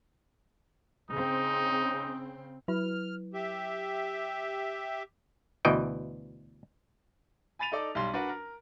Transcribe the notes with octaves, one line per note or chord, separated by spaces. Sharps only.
C#3 C4 D#4
F#3 E4 B4 F6
G4 E5
D2 B2 E3 D#5 G5
G#5 B5 A6 D#7 F7
D#4 A4 D5
B1 G3 C6
D4 F#4 A#4 B4
A#4